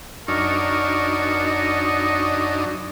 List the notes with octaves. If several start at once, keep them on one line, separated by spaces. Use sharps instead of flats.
F#2 D4 D#4 A#4 C#6
D#5